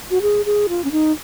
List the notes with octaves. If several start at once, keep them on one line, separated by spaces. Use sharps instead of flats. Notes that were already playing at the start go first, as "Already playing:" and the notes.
F#4
G#4
G#4
F4
C#4
D#4